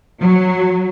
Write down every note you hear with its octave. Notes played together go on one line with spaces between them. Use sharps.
F#3